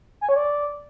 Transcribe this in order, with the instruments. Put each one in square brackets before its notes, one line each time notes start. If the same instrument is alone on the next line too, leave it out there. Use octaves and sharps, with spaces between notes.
[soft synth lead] G#5
C#5
D5